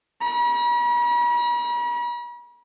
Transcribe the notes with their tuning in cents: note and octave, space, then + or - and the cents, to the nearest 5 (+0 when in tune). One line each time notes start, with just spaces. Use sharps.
B5 -45